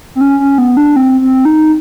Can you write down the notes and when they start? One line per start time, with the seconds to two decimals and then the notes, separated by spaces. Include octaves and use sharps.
0.15 C4
0.21 C#4
0.40 C#4
0.58 B3
0.77 D4
0.96 C4
1.21 C4
1.45 D#4